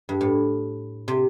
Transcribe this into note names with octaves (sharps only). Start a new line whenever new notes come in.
G2
A2
C3